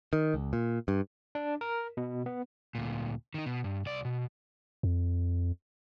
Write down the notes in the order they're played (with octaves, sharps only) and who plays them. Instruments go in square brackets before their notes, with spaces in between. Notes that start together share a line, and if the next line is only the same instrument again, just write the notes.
[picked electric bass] D#3
C#2
A#2
G2
[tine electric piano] D4
A#4
B2
B3
[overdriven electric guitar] D2 A#2
D#3 D#4
B2
G2
C2 D5
B2
[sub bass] F2